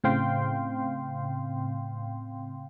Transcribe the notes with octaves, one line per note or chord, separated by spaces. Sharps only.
A2 C#3 C4 F5 G5 C6